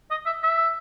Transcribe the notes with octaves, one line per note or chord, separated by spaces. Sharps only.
D#5
E5
E5